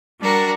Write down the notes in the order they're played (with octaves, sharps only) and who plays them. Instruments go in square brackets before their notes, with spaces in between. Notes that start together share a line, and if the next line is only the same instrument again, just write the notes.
[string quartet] G3 D4 F#4 A#4